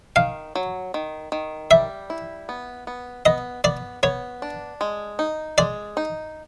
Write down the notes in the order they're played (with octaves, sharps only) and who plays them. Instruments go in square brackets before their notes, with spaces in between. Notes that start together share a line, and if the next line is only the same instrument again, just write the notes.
[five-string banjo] D#3 [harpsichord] F5
[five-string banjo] F#3
D#3
D#3
[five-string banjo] G3 [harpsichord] E5
[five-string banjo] E4
B3
B3
[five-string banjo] B3 [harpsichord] D#5
[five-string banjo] B3 [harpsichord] D5
[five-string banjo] B3 [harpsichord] C#5
[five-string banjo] D4
G#3
D#4
[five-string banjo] G#3 [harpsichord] D5
[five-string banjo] D#4